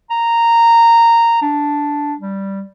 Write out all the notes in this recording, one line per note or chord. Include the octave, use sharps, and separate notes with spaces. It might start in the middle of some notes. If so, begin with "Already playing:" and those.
A#5
D4
G3